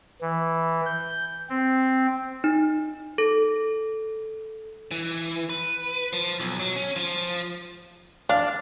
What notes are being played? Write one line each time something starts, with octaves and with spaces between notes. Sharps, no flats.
E3
G6
C4
D#4
A4
E3
B4
F3
B1
F#3
C#4
F3
D4 F5